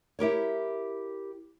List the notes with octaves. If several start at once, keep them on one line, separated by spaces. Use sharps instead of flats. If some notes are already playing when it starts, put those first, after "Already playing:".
E4 G4 A#4 C#5